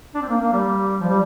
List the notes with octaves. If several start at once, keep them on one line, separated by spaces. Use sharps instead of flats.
D4
C4
A#3
A#3
G3
F3
G3